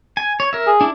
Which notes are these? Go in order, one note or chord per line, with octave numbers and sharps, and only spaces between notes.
G#5
C#5
A#4 E5
G#4
D4 E4